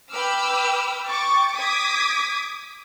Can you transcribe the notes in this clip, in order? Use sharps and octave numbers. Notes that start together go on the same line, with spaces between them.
B4 G5 B5 D6 E6 F6
G5 C#6 D6 A6
D6 D#6 G#6 B6